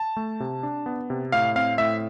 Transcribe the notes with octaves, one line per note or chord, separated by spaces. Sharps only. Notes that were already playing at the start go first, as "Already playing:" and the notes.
Already playing: A5
A3
C3
D4
B3
C3
A2 F5
C4 F5
A2 E5